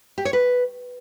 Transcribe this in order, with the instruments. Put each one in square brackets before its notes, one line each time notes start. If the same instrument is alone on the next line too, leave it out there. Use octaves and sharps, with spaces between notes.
[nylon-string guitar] G4
C#5
B4